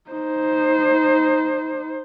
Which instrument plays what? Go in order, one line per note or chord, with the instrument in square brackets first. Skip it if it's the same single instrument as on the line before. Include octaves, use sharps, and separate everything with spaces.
[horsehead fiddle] D#4 C5